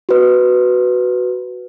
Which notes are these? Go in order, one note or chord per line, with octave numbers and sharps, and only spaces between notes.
F#4 B4